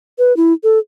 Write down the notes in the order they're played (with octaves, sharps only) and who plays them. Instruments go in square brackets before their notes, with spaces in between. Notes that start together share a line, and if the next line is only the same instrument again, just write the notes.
[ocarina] B4
E4
A4